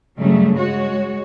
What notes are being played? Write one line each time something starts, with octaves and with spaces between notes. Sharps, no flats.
G2 C#3 F#3 G3 A3
G#3 F#4 C#5